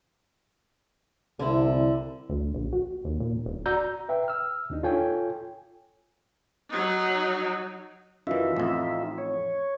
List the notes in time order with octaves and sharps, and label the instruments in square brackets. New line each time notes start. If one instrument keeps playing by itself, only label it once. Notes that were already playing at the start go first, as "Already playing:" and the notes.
[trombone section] C2 [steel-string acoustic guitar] D3 E4
[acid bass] D2
A#1
F#4
D#2
A#2
D#1
[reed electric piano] D2 F#4 D5 A#5 E6 G6
A#5
B4 E5 G5
E6 F6
D#2 D4 D#4
F4 A4 C#5 G5 G#5
[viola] F#3 D#4
[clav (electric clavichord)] F#2 E3 [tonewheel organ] D#4 F4 E5
[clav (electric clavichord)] A1 F2
[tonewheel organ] C#5